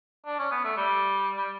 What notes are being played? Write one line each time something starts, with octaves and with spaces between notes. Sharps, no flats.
D4
C#4
B3
A3
G3
G3